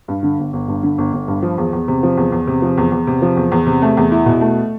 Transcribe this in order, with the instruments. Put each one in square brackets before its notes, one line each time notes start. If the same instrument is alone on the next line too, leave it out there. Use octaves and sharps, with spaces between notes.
[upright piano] G2
D3
G1
G1
G2
D3
G1
G1
G2
F3
E2
E2
C3
F3
E2
E2
C3
F3
E2
E2
C3
F3
E2
E2
C3
A3
E2
E4
B2
A3